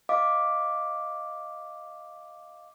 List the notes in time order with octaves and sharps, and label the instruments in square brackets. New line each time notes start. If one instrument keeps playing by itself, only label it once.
[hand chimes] D#5 F5 D6